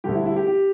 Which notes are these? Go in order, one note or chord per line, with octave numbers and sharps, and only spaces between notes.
D2 D3 G3 G4
E4
E4
G4
G4